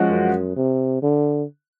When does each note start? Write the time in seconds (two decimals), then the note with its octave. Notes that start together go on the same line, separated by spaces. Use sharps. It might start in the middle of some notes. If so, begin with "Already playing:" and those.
Already playing: F3 G#3 C#4 F#4
0.10 F#2
0.56 C3
1.02 D3